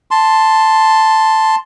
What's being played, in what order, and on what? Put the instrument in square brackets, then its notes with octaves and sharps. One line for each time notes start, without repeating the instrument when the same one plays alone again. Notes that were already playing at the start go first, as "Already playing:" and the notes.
[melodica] A5 C6